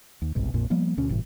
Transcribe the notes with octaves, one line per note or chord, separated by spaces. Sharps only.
D#2
G1 C2 G#2 B2
A#1 F2 A#2
F3 G3 A#3 B3
D2 B2 C#4
G1 A2 C3 E3